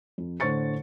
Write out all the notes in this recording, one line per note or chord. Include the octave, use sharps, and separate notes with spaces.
F2
A2 D3 C5 C#6 A6 C#7